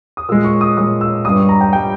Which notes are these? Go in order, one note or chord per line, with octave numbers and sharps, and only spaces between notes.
D#6
A#2 G#3 E6
C#6
D#6
A#2 G#3 D#6
E6
G2 G3 D#6
C#6
A#5
G5
G3 G5